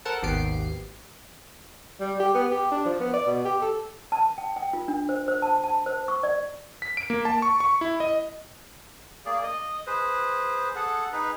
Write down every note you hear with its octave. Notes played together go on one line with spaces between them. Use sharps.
A4 A#4 C5 F#5 A5
G#1 D#2 B3 G4 C7 D7
G3
G4
B3
G4
D4
F3
B3
D5
B2
G4
A4
A5
G5
G5
F4
D4
C5
C5
A5
A5
C5
C#6
D5
B6
D7
A#3
A5
C#6
C#6
E4
D#5
A#3 G#4 D5
D#5
G#4 B4 C5
G#4 A4 F#5
D#4 G#4 B4